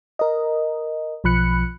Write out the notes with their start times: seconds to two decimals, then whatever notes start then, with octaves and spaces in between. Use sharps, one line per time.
0.19 A#4 D#5
1.24 B1 F3 B5 F#6 C#7